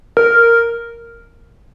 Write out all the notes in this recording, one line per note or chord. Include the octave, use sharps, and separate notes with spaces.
A#4